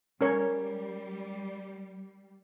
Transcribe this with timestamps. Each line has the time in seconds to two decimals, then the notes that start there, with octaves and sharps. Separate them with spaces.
0.21 G3 C#4 A#4 C#5